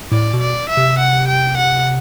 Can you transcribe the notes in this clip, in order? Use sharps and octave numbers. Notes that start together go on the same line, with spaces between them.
A2 D5
B2
D5
E5
C3
F#5
G5
F#5